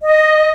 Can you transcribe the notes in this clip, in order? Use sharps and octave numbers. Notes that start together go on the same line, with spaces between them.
D#5